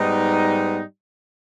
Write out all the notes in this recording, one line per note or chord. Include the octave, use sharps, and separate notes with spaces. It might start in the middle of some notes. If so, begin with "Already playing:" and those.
Already playing: G#2 G3 B3 D#4